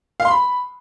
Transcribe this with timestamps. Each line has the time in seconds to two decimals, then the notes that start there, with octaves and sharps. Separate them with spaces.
0.20 F5
0.25 C6
0.30 B5